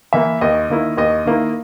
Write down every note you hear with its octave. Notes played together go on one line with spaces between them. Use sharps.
E3 A#3 E5
D#2 D#5
D#3 A#3 E4
D#2 D#5
D#3 A#3 E4